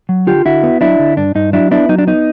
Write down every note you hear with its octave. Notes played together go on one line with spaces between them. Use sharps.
F#3
D3 F4 G4
D3 E4 F#4
B3
F#3 D4 E4
D3
G2 D4
G2 D#4
F#3 D4 E4
B3 D4 E4
F#3 D#4
D4
B3 D#4